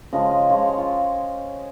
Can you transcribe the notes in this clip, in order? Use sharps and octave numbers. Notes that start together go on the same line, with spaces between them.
C#3 F3 G#3 D#5
D#5
C#3 F3 G#3 C#5
D#5
G#4
F4